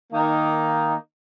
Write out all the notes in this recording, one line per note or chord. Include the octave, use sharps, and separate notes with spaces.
D#3 A#3 D#4